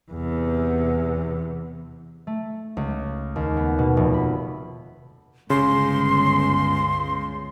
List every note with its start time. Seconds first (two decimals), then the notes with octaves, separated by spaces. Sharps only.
0.12 E2 C3
2.27 A3
2.77 C#2
3.36 D#2
3.57 B3
3.79 B2
3.97 F1
4.14 B5
5.50 G1 C#2 C#3 C6